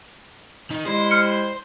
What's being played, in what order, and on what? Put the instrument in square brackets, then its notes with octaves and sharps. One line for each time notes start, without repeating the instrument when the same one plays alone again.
[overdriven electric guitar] D#3
[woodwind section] G3 G#3 E4 [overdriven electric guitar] C5
[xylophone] F6 C#7